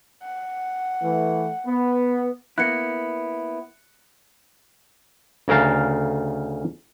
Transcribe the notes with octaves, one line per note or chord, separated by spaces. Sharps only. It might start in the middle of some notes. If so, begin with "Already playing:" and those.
F#5
E3 A3
B3
A#3 B3 E4 F#6 C#7
D2 C#3 A#4 F5 A5